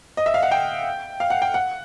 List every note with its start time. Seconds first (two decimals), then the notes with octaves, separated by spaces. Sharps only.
0.17 D#5
0.26 E5
0.34 F5
0.42 F#5
0.51 G5
1.20 F5
1.30 F#5
1.42 G5
1.54 F#5